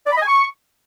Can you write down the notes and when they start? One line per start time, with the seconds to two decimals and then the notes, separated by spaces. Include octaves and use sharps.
0.06 D5
0.11 B5
0.17 D#5
0.22 G#5
0.27 C#6